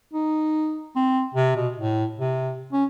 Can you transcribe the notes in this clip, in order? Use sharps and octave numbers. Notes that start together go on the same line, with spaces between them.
D#4
C4
C3
B2
A2
C3
C#4